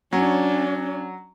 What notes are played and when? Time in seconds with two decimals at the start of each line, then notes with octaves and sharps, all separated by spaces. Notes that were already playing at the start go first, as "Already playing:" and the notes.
0.13 F#3 C#4 D4